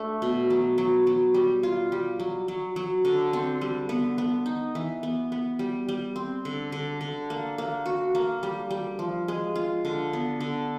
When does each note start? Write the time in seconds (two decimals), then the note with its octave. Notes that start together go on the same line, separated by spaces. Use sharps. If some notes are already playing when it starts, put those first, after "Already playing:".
Already playing: A3 D4
0.22 B2
0.50 F#3
0.78 F#3
1.07 F#3
1.34 G3
1.63 F4
1.92 G3
2.20 F#3
2.48 F#3
2.76 F#3
3.05 D3
3.33 C4
3.61 G3
3.89 B3
4.18 B3
4.46 D#4
4.75 E3
5.03 B3
5.32 B3
5.59 G3
5.89 G3
6.16 C4
6.45 D3
6.72 D3
7.01 D3
7.30 A#3
7.58 A#3
7.86 F#4
8.15 A#3
8.43 G3
8.71 G3
8.99 F3
9.28 G#3
9.56 F4
9.85 D3
10.13 B3
10.40 D3